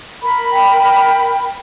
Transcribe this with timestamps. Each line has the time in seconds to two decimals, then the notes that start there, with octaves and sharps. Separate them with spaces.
0.22 A#4 B5
0.52 G5